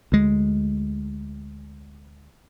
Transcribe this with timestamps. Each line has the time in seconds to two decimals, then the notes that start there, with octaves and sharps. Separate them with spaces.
0.12 D2 G#3